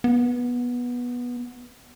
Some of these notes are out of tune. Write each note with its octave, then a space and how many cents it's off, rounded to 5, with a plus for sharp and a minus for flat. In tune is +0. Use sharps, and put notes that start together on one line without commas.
B3 -15